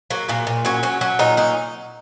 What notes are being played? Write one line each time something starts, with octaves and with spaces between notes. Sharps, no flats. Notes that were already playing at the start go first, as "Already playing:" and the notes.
F#3 A#3
A#2 A#3
A#2
F#3 C#4
F#3 C#4
F#3 C#4
A#2 D#4
F#3 D#4